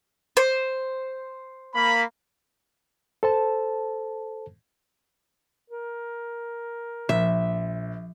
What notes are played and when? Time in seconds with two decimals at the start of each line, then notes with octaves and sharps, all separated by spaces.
0.37 C5
1.74 A#3 B5
3.23 A4 C5 A5
5.70 A#4
7.09 A#1 F3 E5